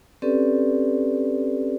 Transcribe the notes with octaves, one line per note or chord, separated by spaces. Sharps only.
C4 C#4 G4 A4 B4 D5